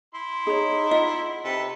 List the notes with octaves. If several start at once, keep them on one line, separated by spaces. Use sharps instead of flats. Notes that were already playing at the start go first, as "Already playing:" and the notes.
E4 C6
D#4 G#4 C#5
F4 D#5 F#5
C3 A4 B4